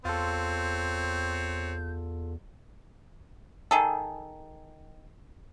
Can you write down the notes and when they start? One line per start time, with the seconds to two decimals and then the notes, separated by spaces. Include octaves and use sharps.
0.05 E2 C4 F4 A4 C#5 G6
3.71 D#3 G#4 A4